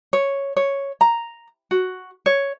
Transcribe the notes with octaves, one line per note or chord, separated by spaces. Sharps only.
C#5
C#5
A#5
F#4
C#5